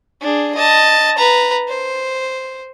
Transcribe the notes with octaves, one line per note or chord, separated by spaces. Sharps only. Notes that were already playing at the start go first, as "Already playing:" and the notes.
D4 G#4
D#5 A5
B4 A#5
C5